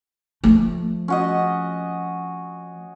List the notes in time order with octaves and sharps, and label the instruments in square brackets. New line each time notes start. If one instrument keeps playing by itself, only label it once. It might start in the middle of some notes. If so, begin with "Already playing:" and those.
[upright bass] F3 A3
[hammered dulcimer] C#4 F#4 D#5